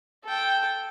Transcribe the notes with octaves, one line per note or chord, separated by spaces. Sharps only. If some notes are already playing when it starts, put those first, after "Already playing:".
A4 G5